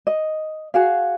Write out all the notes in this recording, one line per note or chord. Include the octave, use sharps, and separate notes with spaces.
D#5
F#4 G#4 F5